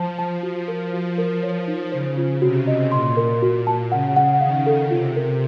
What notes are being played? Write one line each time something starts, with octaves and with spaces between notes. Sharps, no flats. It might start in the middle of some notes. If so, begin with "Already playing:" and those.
Already playing: F3 C5 A5
A5
F#4
A#4
F3 F#4
A#4
C#5
D#4
C#3 C5
F4
C3 F#4
D#5
A#2 C6
A#4
F#4
A5
C#3 F#5
F#5
D#3 F5
A4
C3 F4
A#4